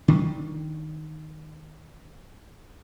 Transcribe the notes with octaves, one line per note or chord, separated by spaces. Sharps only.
D#3 D4